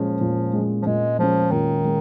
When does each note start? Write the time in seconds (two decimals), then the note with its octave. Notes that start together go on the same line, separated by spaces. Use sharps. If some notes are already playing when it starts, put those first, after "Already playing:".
Already playing: A#2 F3 G#3 C#4
0.21 A#2
0.53 G#3 C#4
0.82 F3
0.87 A#2 G#3
1.19 F3 G#3 C#4
1.52 A#2 D#3
1.85 G#3